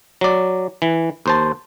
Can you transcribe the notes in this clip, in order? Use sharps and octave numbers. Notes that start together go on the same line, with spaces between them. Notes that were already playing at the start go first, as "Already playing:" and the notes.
F#3 D5
E3
D#2 C5 A5